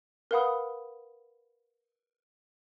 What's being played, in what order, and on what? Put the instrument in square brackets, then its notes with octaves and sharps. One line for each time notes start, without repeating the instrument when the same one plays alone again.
[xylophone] A#4 B4 F5 F#5 B5 D#6